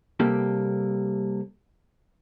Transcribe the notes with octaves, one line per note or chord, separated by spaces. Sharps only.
C3 G3 A#3 G4 A4